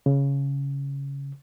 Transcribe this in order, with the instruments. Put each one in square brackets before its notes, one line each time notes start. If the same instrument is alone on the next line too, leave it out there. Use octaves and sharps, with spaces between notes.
[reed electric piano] C#3